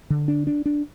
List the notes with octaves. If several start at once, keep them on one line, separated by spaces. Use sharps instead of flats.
D3
D4
D4
D4